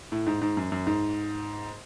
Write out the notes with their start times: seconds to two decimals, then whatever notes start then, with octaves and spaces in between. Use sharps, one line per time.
0.12 A2
0.27 G#2
0.42 G#2
0.57 F#2
0.72 F#2
0.87 G#2